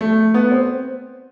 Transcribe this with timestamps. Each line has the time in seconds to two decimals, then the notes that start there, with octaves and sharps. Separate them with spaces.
0.01 A3
0.34 B3
0.51 C4